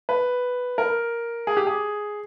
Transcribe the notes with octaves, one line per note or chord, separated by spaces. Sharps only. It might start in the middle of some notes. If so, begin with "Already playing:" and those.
B4
A#4
G#4
G4
G#4